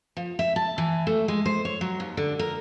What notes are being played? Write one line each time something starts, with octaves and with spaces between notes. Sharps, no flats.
F3
E5
A5
E3
A3
G#3
C5
C#5
F#3
D#2
D3
A#4